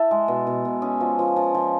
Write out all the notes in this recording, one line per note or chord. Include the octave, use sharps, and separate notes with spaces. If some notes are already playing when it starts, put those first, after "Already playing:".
Already playing: E4 A4
G#3
B2
B2
B2
C#4 G#4
F3
F3
F3
F3